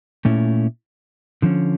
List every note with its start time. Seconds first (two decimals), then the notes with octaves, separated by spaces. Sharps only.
0.25 A#2 A3 C#4 E4
1.42 D3 F3 C#4